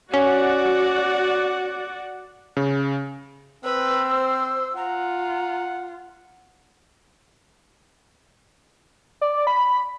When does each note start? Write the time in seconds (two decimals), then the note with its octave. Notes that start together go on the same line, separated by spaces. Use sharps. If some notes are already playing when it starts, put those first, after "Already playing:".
0.14 C#4 F#4 D5 F#5
2.57 C#3
3.65 C4 B4 E6
4.10 C5
4.77 F4 F#5 A#5
9.21 D5
9.47 B5